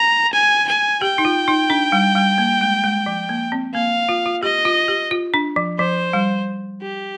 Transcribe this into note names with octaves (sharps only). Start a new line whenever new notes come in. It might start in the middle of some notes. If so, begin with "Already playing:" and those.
Already playing: A#5
G#5
G#5
G4 G5
D#4
F4
D#4
D4
G3
G3
A#3
G#3
G#3
F3
A#3
C4
A#3 F5
F4
F4
G4 D#5
F4
G4
F4
D4
F3
F3 C5
G3
G4